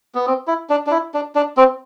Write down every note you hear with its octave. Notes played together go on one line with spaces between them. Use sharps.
B3
C4
E4
D4
D4
E4
D4
D4
C4